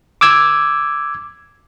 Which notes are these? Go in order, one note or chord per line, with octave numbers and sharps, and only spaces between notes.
D6 E6 G#6